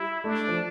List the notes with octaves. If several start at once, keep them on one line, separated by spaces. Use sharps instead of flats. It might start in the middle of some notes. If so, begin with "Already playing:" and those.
Already playing: G3 E4
A3 D4
F3